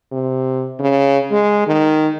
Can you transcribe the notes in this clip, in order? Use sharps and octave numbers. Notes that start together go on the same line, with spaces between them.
C3
C#3
G#3
D#3